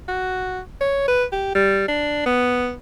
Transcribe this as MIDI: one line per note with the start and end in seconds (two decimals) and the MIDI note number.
0.08 0.60 66
0.81 1.03 73
1.08 1.24 71
1.32 1.53 67
1.55 1.86 55
1.88 2.23 62
2.26 2.74 59